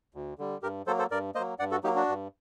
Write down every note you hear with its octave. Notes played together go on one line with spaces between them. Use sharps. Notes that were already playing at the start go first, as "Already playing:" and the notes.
D2
D3 G3
G2 G4 A#4
F#3 A#3 A4 C5
A4 C5
G2 A#4 D5
F#3 A#3 C5 D#5
G2 D5 F#5
F#4 A4
F#3 A#3 D#4 G4
D4 F#4
G2